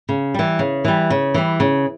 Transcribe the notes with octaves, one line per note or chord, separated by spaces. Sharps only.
C#3
E3 G3
C#3
E3 G3
C#3
E3 G3
C#3